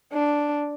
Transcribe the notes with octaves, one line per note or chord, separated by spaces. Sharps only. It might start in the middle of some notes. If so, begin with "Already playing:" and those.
D4